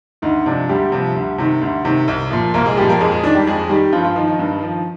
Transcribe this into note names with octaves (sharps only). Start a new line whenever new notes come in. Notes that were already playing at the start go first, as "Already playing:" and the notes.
D2 D#3 D#4
C3 F3 D4
D2 G3 G4
C3 F3
D2
C3 D#3
D2
C3 D#3
C2
A#2 F3
C2 A#3 A#4
G#3 G#4
A#2 F3 G3 G4
A#3 A#4
F2 G#3 G#4
G#3 G#4
D#3 D4
G3 G4
F2 G#3 G#4
D#3 G3 G4
G2 F3 F4
F3 F4
D#3 F3 D#4
D#3 D#4
G2
F3